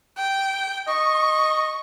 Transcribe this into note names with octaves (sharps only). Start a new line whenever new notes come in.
G5
D#5 C#6